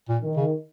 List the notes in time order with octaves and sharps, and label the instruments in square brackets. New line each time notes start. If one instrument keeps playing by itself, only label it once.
[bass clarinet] A#2
[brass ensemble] D#3
[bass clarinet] C#3